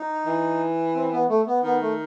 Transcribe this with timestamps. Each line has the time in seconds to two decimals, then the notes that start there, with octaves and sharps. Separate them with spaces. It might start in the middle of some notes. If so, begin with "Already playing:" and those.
Already playing: D#4
0.26 E3
0.95 C4
1.12 B3
1.29 A3
1.47 B3
1.63 D#3 B3
1.81 A3